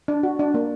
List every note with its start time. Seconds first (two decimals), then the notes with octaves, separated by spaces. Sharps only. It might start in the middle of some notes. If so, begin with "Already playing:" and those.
0.08 D4
0.23 F#4
0.39 D4
0.54 A#3